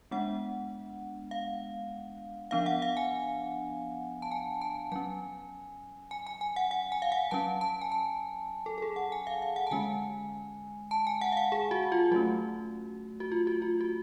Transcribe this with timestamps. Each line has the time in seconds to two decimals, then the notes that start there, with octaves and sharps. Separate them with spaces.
0.11 G#3 B3 D4 F#5
1.31 F5
2.51 F3 B3 D4 F5
2.66 F#5
2.82 F5
2.97 G#5
4.22 A5
4.31 G#5
4.61 A5
4.92 F#3 C#4 G#5
6.11 G#5
6.27 G#5
6.41 G#5
6.56 F#5
6.71 F#5
6.92 G#5
7.02 F5
7.12 F#5
7.31 F#3 C#4 A5
7.61 A5
7.81 G#5
7.92 A5
8.66 A4
8.78 A4
8.82 G#4
8.96 F#5
9.12 G#5
9.27 F5
9.42 F5
9.56 F#5
9.67 A5
9.71 D3 G#3 C#4 G#5
10.91 A5
11.07 G#5
11.21 F#5
11.32 F5
11.37 F#5
11.52 G#4
11.71 F#4
11.92 F4
12.11 F#3 A3 C#4 F#4
13.20 F#4
13.32 F4
13.47 F#4
13.62 F4
13.81 F#4